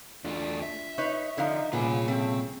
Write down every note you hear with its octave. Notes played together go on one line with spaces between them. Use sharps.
E2 A3 D4 F4 D5
E5
D#4 B4 C#5
D3 F3 D#4 F5
C2 A#2 C#3 B3 F4 G#5
F3 A3 C4